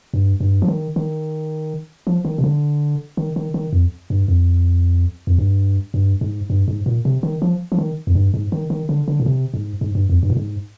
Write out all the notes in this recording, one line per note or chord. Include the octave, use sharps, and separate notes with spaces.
G2
G2
F3
D#3
D#3
F3
D#3
C3
D3
D#3
D#3
D#3
F2
G2
F2
F2
G2
G2
G#2
G2
G#2
A#2
C3
D#3
F3
F3
D#3
F2
G2
G#2
D#3
D#3
D3
D3
A#2
C3
G#2
G#2
G2
F2
G2
A#2
G#2